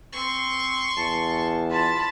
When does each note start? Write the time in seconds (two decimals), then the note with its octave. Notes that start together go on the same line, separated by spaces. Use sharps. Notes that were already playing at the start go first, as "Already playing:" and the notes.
0.12 C4 C6 C#6
0.97 E2 A5
1.70 F4 A5 B5